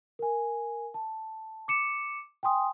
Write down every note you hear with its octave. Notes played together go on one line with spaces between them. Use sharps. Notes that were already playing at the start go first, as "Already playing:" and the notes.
A#4 G#5
A5
D6 C#7 E7
G5 G#5 C6 D#6